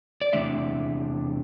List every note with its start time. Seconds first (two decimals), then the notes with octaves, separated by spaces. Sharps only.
0.22 D5
0.33 E2 C3 E3 A3 D4 E5